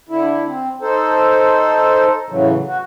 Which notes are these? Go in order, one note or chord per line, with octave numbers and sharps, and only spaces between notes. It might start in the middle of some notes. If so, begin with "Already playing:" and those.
D3 E4
C4
D#4 A4 C5
A2 C#3 E3 F#3
F#4